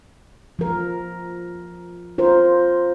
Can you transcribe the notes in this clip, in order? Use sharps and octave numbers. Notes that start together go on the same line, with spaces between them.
F3 A#4
F4 A#4 C5